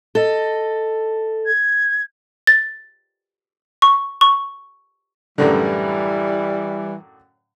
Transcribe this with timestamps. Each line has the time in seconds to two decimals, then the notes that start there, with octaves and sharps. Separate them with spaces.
0.15 A4 D#5
1.46 G#6
2.47 A6
3.82 C#6
4.21 C#6
5.38 F#2 A2 D3 E3 G3